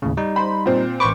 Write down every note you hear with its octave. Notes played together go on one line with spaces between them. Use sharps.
D#2 A2 C#3
G3 D#4
C5 B5
A#2 C4
A1 B4 C5 C#6 D6